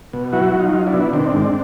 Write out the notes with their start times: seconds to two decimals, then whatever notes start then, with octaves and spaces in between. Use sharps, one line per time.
0.13 B2
0.33 F#3 E4 F#4
0.53 F#3
0.59 D#4 F4
0.74 F#3
0.87 D4 E4
0.93 B2
1.13 D#3 C4 D4
1.34 G#2